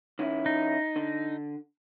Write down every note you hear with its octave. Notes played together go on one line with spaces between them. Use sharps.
D#3 C#4 E4
D#4
D3